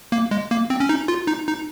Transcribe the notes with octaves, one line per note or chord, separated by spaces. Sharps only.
A#3
G#3
A#3
C4
C#4
D#4
F4
D#4
D#4